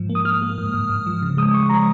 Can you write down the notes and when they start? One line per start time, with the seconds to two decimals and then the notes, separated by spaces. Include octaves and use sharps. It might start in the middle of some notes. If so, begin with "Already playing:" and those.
Already playing: G#2 F3
0.10 A#3
0.15 D#6
0.25 A#3 F6
0.42 A#3
0.58 G#2
0.74 G#2
0.89 G#2
1.06 F3
1.22 C#3
1.37 G#3 D#6
1.54 G#3 C#6
1.69 F3 A#5